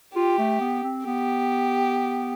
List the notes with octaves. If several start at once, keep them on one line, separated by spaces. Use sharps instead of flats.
F4 G4
A3
B3
C4
B3 G4